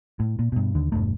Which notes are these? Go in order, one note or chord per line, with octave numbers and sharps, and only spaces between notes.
A2
A#2
G2 B2
D#2 D3
E1 C#2 G2 A3